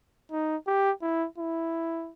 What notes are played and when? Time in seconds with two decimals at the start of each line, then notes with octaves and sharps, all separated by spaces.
0.32 D#4
0.67 G4
1.02 E4
1.38 E4